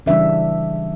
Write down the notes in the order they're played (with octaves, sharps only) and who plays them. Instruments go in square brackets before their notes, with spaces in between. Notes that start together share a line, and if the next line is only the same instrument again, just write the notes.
[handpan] C#3 E3 G3 D4 E5